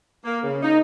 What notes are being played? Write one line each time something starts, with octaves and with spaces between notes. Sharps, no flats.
A#3
C#3
D#4